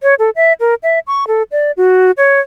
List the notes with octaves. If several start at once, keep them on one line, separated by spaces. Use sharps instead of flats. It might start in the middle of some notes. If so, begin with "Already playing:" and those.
C#5
A4
E5
A#4
E5
C#6
A4
D5
F#4
C#5